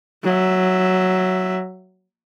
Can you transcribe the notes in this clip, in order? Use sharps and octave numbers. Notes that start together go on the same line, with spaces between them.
F#3 E5